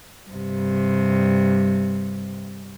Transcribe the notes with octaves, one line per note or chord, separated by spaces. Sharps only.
G2 C3